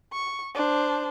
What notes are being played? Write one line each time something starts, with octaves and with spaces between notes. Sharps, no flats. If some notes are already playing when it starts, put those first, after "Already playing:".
C#6
D4 C5